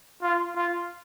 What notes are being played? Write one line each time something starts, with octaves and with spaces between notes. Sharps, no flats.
F4
F4